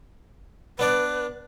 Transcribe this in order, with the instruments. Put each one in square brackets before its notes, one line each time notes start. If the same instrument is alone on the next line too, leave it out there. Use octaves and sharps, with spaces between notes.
[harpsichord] B3 D4 D5 [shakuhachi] B4